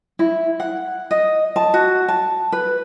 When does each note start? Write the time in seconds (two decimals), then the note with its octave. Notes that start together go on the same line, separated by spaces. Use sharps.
0.19 E4
0.60 F#5
1.11 D#5
1.56 A5
1.74 F#4
2.08 A5
2.52 B4